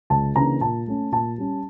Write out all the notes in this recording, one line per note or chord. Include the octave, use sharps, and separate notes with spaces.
C#2 A5
C#3 E3 A#3 D4 A#5
A#2 A5
A3 C#4
A#2 A5
G3 C#4